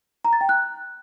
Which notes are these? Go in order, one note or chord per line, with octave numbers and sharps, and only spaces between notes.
A#5
A6
G5
F#6